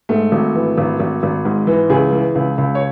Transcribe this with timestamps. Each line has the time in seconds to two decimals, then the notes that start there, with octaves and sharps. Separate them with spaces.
0.09 G#2 A3
0.32 G#1
0.55 E3
0.78 G#1
1.00 G#1
1.23 G#1
1.45 G#2
1.67 E3
1.90 C#2 G#4
2.13 E3
2.35 C#2
2.58 C#2
2.75 C#5